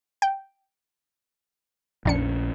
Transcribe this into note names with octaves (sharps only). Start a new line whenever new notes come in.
G5
A#1 F2 C#4 D4 C#7